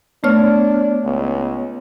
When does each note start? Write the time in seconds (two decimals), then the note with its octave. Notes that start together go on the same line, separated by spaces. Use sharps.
0.24 A3 B3 D4 C#5 F6
1.04 C#2